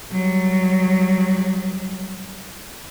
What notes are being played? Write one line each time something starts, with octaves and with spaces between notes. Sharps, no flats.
F#3 G3